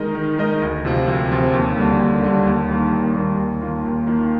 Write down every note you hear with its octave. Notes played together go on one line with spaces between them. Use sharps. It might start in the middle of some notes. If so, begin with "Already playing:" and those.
Already playing: D#3 G#3 D#4 A#4 D#5
D#3
G#3 D#4 A#4 D#5
D2
C3 F3 C4 F4
D2
C3 F3 C4 F4
D#2
D3 G3 A#3 D4
D#2
D3 G3 A#3 D4
D#2
D#3 G3 A#3
D#2
D#3 G3 A#3
D#2
D#3 A#3 F4
D#2
D#3 A#3 F4